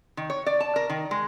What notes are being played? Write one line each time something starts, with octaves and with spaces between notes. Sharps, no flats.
D#3
C#5
D5
A5
A#4
D#3
G#3